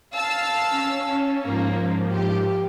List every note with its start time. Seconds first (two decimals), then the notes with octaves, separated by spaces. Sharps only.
0.14 F5 A5 E6
0.69 C#4
1.44 G#2 F3 A#3
2.11 G4